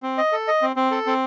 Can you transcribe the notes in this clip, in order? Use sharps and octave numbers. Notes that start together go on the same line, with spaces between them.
C4
D#5
A4
D#5
C4
C4
A4
C4